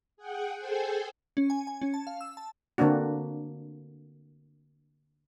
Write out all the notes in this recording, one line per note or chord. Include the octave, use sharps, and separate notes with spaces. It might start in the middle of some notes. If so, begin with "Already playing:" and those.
G#4 F#5 G5
G#4 A4 C5 G5 G#5
C#4
G#5
G#5
C#4
A5
F5
E6
A5
D3 A#3 C4 D4 F#4